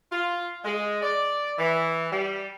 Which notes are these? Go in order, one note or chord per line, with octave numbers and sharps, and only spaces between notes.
F4
G#3
D5
E3
G3